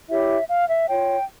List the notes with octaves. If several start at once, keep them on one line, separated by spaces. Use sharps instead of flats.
E4 G4 C#5 E5
F5
E5
F4 C#5 G5